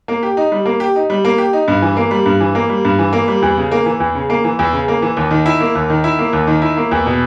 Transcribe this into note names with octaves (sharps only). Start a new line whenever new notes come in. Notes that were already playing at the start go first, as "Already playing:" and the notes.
A#3
G4
D#4
G3
A#3
G4
D#4
G3
A#3
G4
D#4
G2
E3
A#3
G3
G2
E3
A#3
G3
G2
E3
A#3
G3
E2
C#3
A#3
E3
E2
C#3
A#3
E3
E2
C#3
A#3
E3
D#2
D#3
E4
A#3
D#2
D#3
E4
A#3
D#2
D#3
E4
A#3
E2
B2